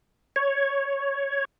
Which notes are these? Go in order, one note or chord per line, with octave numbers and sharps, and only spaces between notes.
C#5